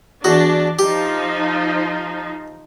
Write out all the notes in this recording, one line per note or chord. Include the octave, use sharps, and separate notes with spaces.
E2 D4 F#4
F3 D#4 G4